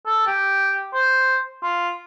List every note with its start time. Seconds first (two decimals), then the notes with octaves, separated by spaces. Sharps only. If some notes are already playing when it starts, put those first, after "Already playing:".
0.06 A4
0.27 G4
0.94 C5
1.63 F4